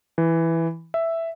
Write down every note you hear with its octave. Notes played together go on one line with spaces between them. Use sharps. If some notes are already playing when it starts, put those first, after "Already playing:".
E3
E5